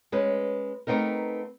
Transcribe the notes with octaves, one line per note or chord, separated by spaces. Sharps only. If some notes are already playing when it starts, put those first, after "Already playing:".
G#3 C#4 B4
A3 B3 C4 D#4 A#4